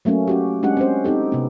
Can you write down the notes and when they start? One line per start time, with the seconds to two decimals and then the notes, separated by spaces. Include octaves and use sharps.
0.05 F#3 A3 A#3 C#4
0.28 C#4 F#4 G4
0.63 G#3 C#4 D4 G4 F#5
0.77 C4 C#4 C5
1.04 C4 D#4 G4 A4
1.32 C3 B3